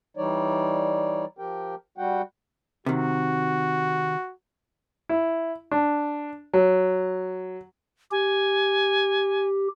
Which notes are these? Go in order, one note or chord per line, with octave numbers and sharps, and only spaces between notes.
E3 G3 D#4 C#5 D5
F3 G4 A#4 G5
G3 F#4 F#5 G5
C3 D#3 F#4
E4
D4
F#3
G4 G#5